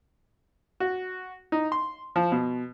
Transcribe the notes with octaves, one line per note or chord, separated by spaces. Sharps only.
F#4
D#4
C6
F3
B2